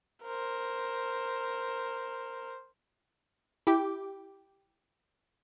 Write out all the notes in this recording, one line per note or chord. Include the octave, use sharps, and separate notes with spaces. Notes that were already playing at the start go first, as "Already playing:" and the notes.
A#4 C5
E4 G4 G5 D6